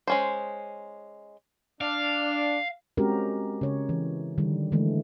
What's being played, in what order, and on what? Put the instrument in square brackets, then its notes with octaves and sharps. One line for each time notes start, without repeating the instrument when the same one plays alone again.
[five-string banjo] G#3 C#4 C5
[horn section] D4 [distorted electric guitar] F5
[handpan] G#3 C4 C#4 F#4 G4 A#4
C#3 C#5
E3
D3 D#3 G3
D3 E3 G#3 A3